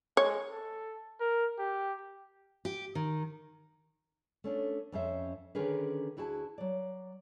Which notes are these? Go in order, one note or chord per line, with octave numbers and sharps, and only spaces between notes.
G#3 C#5
A4
A#4
G4
G4
D#3
A3 C#4 D4
F2 C#4 C5 E5
D3 D#3 C#4 G#4 A#4 B4
D2 E4 F#4 G#4 A5
F#3 D5